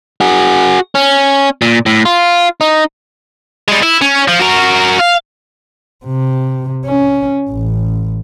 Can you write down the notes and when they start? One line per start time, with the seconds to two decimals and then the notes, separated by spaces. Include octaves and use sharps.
0.21 F#4 G#4
0.95 C#4
1.62 A#2
1.86 A2
2.05 F4
2.61 D#4
3.68 G3 G#3
3.83 E4
4.02 C#4
4.28 F3
4.40 F#4 A#4
4.99 F5
6.05 C3
6.85 C#4
7.49 A1